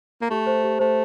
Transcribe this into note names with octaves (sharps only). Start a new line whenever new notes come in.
A#3
A3 G4
C5
G4
A3 C5